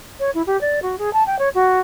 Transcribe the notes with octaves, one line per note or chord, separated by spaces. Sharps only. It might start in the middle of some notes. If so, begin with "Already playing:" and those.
C#5
E4
G4
D5
F#4
G#4
A5
G5
C#5
F#4